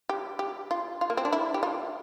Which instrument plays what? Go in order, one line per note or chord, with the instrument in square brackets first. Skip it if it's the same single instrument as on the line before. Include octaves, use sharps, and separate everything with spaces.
[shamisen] G4
G4
F4
F4
A#3
C4
D4
E4
G4
F4